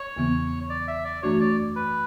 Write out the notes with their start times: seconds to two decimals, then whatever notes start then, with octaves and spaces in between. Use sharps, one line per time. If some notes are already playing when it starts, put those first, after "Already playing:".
Already playing: C#5
0.17 E2 C#3 E3 B3
0.70 D5
0.88 E5
1.05 D5
1.22 F#2 E3 A3 D4 F#4 C#5
1.41 D5
1.76 B4